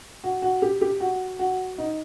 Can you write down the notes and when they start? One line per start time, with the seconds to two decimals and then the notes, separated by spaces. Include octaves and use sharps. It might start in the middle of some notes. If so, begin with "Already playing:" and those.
0.24 F#4
0.42 F#4
0.62 G4
0.81 G4
1.00 F#4
1.39 F#4
1.78 D#4